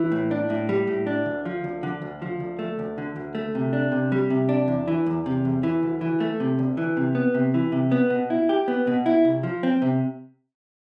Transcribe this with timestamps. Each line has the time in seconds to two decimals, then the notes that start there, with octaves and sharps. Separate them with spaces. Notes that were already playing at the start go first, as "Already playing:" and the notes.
Already playing: E3
0.12 A2
0.31 D4
0.50 A2
0.69 G3
0.87 A2
1.07 D4
1.26 D2
1.45 F3
1.64 D2
1.83 D3
2.02 D2
2.22 F3
2.40 D2
2.59 A3
2.79 D2
2.98 D3
3.16 D2
3.35 A3
3.55 C3
3.73 D4
3.92 C3
4.12 G3
4.30 C3
4.49 D4
4.68 E2
4.88 E3
5.06 E2
5.26 C3
5.45 E2
5.63 E3
5.83 D2
6.01 E3
6.20 A3
6.40 C3
6.59 D2
6.77 E3
6.97 C3
7.15 B3
7.34 C3
7.54 E3
7.72 C3
7.92 B3
8.10 B2
8.30 E4
8.49 G4
8.68 B3
8.87 B2
9.06 E4
9.25 C2
9.43 F3
9.63 C4
9.82 C3